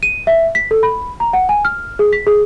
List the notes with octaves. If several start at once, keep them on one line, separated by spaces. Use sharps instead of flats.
D#7
E5
B6
A4
B5
A#5
F#5
G#5
F6
G#4
B6
G#4